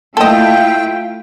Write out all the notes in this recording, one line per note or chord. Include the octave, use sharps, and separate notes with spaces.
A3 E4 F4 A4 D#5 G5